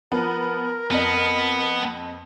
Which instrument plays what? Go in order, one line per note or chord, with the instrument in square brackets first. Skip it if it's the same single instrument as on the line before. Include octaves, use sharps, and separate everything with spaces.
[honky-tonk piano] F3 B3 [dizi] A#4
[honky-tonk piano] F2 D#5 [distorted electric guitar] B3